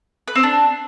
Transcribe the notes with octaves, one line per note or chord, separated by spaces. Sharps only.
B4
C4
D4